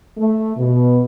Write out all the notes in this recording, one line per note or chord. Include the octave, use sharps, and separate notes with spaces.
A3
B2